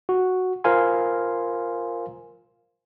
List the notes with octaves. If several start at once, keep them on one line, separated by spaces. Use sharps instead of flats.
F#4
F4 A#4 C5 F5 G#5 C6